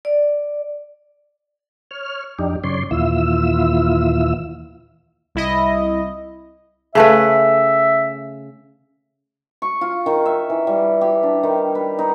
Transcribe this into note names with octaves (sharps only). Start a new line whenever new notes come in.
D5
C#5 F6
F2 D4 D#4 G4
F#2 C#3 C#5 D5 C6
D#2 A#2 E3 E4 F4 E6
C2 E4 D#5
C#3 A3 B4 E5
C#6
F4
D#3
E5
E3
G3
G4
D4
D#3
B4
D#4